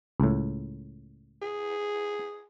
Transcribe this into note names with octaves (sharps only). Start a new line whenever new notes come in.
C#2 A2
G#4